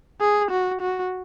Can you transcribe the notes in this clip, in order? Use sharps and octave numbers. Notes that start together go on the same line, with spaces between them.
G#4
F#4
F#4